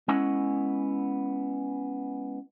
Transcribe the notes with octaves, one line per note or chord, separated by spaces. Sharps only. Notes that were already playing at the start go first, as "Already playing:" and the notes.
G#3 B3 C#4 E4 D#5 F#5